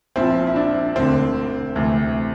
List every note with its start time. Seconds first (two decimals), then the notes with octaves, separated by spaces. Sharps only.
0.16 A#1 A#2 F3 C4 E4
0.47 E4
0.56 D4
0.96 E1 D2 D3 C4
1.76 D2 C3 E3